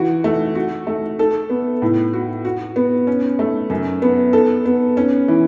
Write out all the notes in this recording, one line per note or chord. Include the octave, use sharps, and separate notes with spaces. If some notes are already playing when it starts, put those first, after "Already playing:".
Already playing: E3 F#4
A3
F#4
A3
A4
B3
A2
F#4
F#4
B3
C#4
A3
F#2
B3
A4
B3
C#4
E3